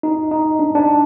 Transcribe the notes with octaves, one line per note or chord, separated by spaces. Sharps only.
D#4
D#4
D4
D4